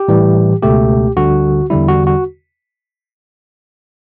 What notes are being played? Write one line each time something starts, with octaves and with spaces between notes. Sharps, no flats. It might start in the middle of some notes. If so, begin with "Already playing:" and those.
Already playing: G4
A2 E3 G3
C#2 B2 A3 G4
D2 D3 G3 F#4
E2 D3 G3 E4
F#4
F#4